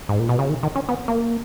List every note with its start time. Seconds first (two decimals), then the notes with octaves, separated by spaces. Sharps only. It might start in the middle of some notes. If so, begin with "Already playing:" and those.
0.09 G#2
0.19 A#2
0.29 B2
0.39 C#3
0.49 D#3
0.63 D#3
0.76 C#4
0.89 B3
1.08 A#3